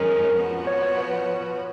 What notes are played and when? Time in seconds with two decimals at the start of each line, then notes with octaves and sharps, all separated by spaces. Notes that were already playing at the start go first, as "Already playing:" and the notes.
Already playing: F2 D#3 G#3 C#4 A#4
0.37 F3 B3 F#4
0.67 C#5
0.83 C#5
0.98 B4
1.14 C#5